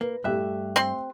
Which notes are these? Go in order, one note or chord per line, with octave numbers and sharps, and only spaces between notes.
A#3 B4
G2 A3 G4 E5 F#6
C4 C6